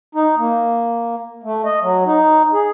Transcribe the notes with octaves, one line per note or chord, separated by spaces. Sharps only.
D#4
A#3
A3
D#5
F#3
D#4
G#4